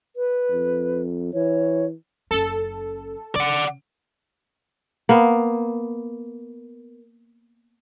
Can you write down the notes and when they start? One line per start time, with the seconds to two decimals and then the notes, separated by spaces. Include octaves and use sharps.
0.16 B4
0.51 F2
1.34 E3 C#5
2.31 F#1 C#4 A4
3.36 C#3 D5 F#5
5.09 A#3 B3